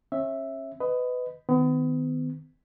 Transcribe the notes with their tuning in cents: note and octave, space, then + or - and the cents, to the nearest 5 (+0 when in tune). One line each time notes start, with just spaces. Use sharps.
C#4 -35 E5 +0
B4 +20 D#5 +0
D#3 +0 B3 +35